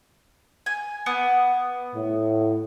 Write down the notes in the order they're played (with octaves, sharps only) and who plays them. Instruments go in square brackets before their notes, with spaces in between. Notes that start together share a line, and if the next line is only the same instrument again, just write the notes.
[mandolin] G#5
B3 D6 D#6
[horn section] A2